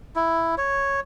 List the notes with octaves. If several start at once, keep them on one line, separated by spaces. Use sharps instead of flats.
E4
C#5